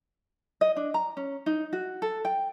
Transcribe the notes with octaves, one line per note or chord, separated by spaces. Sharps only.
D#5
D4
A#5
C#4
D#4
F#4
A4
G5